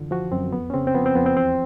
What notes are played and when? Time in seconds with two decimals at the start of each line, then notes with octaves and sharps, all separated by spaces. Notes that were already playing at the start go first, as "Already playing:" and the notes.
Already playing: F#2 D3 E3 F4
0.11 F3 F#4
0.32 F#2 C4
0.53 F2 B3
0.70 C#4
0.74 C#3 C4
0.87 C4
0.95 F3 B3
1.06 C4
1.15 F2 B3
1.26 C4
1.37 E2 C4